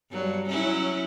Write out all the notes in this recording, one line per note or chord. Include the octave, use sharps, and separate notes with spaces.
G2 F#3
F#3 C#4 E4